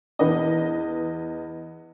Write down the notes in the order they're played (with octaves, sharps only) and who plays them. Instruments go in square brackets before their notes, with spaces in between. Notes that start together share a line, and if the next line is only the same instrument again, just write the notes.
[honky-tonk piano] E2 B4 D#5